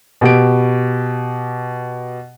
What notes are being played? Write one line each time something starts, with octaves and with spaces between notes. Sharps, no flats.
B2 G4 D7